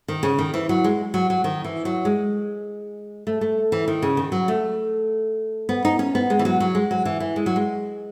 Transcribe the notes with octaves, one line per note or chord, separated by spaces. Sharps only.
D#3
C#3
D#3
E3
F#3
G#3
F#3
F#3
D#3
E3
F#3
G#3
A3
A3
E3
D#3
C#3
D#3
F#3
A3
B3
D#4
C#4
B3
G#3
E3
F#3
F#3
G#3
F#3
E3
E3
G#3
F#3
G#3